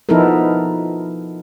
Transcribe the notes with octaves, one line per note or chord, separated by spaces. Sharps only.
F3 B3 D#4 E4 A4 A#4